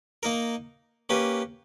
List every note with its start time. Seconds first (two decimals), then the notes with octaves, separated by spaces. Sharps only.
0.23 A#3 D#4 A#4
1.09 A#3 C#4 G4 B4